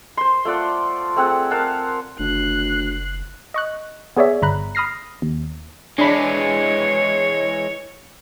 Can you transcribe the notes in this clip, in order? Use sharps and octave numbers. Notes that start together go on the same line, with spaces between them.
C5 C6
A3 F4 D5 F#5
A3 C4 G#4 F#5
A#4 F5 F#5 A5
F#1 D2 F#6 C7
D#5 C#6 F#6
B3 G#4 C#5 D5 E5
G1 A#5 B5 F#6
B5 D#6 F6 A#6 C7
D#2
E3 G#3 D4 C#5 B5